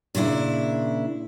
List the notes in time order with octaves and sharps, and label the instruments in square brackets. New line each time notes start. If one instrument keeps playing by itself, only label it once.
[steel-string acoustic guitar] A#2 C#3 D4 E4